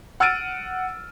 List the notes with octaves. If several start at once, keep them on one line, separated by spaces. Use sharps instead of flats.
F#5 E6 F6 A6 D7 D#7